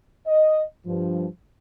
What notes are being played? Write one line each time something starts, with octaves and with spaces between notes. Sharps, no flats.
D#5
G2 F3